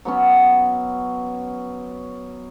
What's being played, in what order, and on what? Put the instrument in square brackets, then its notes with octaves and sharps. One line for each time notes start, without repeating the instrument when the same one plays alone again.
[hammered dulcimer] F#3 B3 C#4